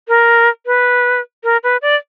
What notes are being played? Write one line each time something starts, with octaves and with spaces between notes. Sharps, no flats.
A#4
B4
A#4
B4
D5